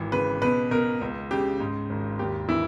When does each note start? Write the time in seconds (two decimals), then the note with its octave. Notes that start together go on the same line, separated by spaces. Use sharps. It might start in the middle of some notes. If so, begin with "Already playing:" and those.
Already playing: G#1 E3
0.12 C#3 B4
0.42 B2 B4
0.71 B2 A#4
1.01 C#2
1.31 C#3 G4
1.60 G#2
1.90 G#1
2.19 D#2 G4
2.49 E3 E4